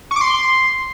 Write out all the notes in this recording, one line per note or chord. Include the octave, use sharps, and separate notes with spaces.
C#6
D6
C6